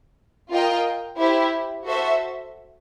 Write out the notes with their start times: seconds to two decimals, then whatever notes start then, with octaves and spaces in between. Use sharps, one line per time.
0.50 F4 A#4 D#5 G5
1.17 E4 G4 C5 E5
1.84 F#4 A4 C5 E5